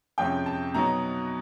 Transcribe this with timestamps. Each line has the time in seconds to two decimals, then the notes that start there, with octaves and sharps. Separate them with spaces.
0.18 F2 C3 F3 G#3 C#4 G5
0.46 A5
0.74 B2 F#3 B3 D#4 A#5